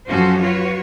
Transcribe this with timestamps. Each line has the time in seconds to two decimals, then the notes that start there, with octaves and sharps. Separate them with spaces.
0.10 F#2 F3 C#4 F#4 A4 C5
0.41 F4 F#4 B4 C#5